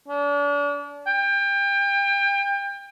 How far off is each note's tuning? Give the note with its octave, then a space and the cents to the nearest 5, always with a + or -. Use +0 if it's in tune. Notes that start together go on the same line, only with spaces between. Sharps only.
D4 -35
G5 +30